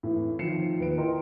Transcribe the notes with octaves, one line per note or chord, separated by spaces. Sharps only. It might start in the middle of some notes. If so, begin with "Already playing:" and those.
A2 E3
D#3 F3 C7 C#7 E7
D#2 B4 D7
E4 A#4 D#5 G5 C6